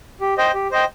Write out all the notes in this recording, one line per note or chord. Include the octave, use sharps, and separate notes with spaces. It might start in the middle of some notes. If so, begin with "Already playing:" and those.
G4
C5 D#5 G5
G4
C5 D#5 G5